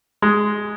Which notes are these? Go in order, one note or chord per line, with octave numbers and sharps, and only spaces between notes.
G#3